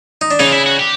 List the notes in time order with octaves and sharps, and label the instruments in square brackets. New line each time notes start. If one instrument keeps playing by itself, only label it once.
[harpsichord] D#4
D4
[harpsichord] C#3 C#4 [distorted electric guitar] D#4
[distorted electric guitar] F4
E4
F#4
G4